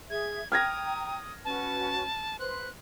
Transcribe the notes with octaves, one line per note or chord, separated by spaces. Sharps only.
G#4 E5 G#6
G5 A#5 D#6 F6 G#6 A#6
C#4 F#4 B4 A5
B4 C5 C6 F#6